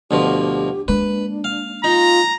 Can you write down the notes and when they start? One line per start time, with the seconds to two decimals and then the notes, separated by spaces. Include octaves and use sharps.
0.11 D2 B2 F3 G4
0.88 G#3 A#3 D4 B4
1.44 F5
1.84 D#4 F4 A#5